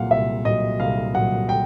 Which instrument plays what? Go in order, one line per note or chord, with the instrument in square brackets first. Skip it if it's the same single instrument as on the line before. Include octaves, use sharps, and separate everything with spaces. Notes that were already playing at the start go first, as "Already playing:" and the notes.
Already playing: [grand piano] C2 A#2 F#3 F5 F#5
C2 E5
A#2 F#3 D#5
C2 F5
A#2 F#3 F#5
G5